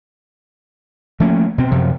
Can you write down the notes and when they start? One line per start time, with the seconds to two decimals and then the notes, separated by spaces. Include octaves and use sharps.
1.20 F3 A3 A#3 C#4
1.58 B2 C4
1.71 F#2 C3 F3